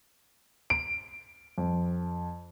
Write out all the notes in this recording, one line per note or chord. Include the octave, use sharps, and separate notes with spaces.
D7
F2